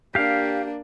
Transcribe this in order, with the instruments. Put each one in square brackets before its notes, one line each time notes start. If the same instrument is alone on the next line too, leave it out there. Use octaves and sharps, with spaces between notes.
[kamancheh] A#3 D4 [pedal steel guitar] G4 F5